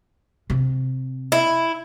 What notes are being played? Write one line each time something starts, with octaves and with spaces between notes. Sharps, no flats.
C3
E4